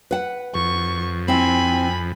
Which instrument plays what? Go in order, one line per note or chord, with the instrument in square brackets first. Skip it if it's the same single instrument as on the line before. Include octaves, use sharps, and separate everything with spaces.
[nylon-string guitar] B4 F#5
[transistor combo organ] F2 [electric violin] C#6
[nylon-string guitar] C4 E4 [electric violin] G#5 B5